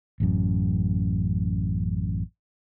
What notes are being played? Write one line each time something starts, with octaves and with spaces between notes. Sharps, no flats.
A1 F#2